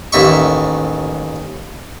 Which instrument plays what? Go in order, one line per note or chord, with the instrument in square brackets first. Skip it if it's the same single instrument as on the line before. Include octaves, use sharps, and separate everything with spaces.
[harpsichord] A1 D#2 E5 C#6